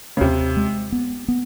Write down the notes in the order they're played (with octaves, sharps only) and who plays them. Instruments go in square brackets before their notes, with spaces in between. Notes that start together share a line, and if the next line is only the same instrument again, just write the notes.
[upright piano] C#3
[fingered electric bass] D#2 [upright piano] C3
[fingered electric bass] G#3
B3
B3